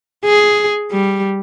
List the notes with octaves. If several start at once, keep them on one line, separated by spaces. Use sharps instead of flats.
G#4
G3